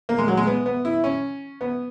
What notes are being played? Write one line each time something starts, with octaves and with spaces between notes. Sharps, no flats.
A#3
G#3
F#3
G#3
B3
B3
E4
C#4
B3